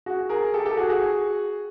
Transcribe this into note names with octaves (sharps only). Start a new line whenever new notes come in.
F#4 G#4
G#4 A#4
G4 A4
G4 A4
F#4 G#4
F#4 G#4